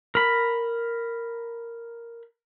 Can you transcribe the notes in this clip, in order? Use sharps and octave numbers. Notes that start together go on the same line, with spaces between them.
A#4 B5